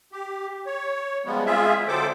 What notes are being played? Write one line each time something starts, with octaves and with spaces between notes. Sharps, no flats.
G4
C#5
C#3 F3 G3 G#3 B3
G#3 C4 F4 G#4 E5
D3 F#3 C4 A4 C5 D6